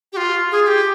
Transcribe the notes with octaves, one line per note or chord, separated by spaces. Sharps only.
G4
F4
G#4
G#4
G4